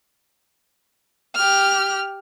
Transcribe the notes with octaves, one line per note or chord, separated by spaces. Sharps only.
G4 F6